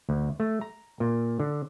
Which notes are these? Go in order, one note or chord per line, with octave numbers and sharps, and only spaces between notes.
D2
A3
A#5
A#2
D3